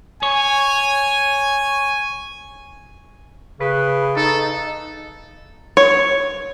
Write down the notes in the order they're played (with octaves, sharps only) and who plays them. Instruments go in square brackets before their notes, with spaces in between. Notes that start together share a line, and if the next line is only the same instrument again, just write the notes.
[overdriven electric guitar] C#5 [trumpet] G#5
[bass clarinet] C#3 [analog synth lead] B4
[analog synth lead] D#4 [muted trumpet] A4
[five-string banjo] C#5